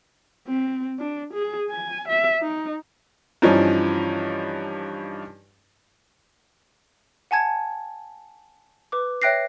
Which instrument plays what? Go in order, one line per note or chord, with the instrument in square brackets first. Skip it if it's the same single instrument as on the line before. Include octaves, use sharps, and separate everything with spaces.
[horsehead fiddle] C4
D4
G#4
G#5
E5
D#4
[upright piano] G2 E3 F3 C#4 D#4
[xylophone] F#5 G#5 A5 G#6
B4 D6
C#5 E5 G5 F#6 A#6 C7